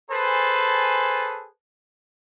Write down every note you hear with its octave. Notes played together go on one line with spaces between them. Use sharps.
G#4 A4 B4 C5 G#5 A5